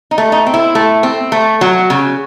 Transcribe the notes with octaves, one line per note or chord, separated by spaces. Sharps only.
D#4
A3
D#4
C4
E4
A3
C4
A3
F#3
C#3